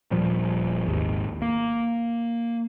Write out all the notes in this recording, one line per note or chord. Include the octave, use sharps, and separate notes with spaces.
D#1 A#2 F3 G3
G#1 D#2
A#3